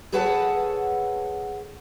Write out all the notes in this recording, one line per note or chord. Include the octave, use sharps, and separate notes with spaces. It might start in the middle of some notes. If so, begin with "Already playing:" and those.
G#4 A4 B4 C#5 F#5 A5